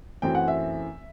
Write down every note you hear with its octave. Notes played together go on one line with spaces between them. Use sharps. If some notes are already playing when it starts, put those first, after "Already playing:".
F#2 E3 A3 C4 G5
F#5
E5